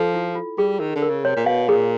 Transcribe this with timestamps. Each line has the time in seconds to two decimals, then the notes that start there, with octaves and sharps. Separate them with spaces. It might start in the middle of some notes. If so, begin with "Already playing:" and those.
Already playing: F3 A4
0.14 E4
0.35 F4
0.58 G3 G#4
0.80 D#3 A#4
0.95 D3
1.02 A#4
1.10 C#3
1.24 C3 C#5
1.36 A#2
1.46 B2 F5
1.68 A#2 G#4